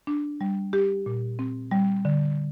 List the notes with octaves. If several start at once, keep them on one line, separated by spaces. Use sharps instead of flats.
D4
G3
G4
A#2
C4
G3
D3